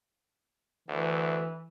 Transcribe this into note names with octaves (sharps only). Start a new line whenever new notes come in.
D2 E3